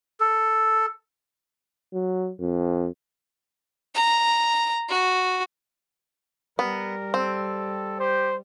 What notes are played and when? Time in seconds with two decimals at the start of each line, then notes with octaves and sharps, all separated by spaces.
0.20 A4
1.93 F#3
2.40 F2
3.95 A#5
4.89 F#4
6.59 G3 B3 A#4
7.14 C4 A4
8.00 G4 C5